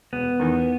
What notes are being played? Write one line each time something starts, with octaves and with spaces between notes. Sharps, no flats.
E1 B3
E2 D#3